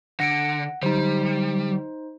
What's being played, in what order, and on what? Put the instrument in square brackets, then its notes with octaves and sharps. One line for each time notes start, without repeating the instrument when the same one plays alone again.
[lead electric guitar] D3 [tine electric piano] F#5 [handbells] A#6 C#7 D7
[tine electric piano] D3 F#3 [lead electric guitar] G3 [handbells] D#4 C5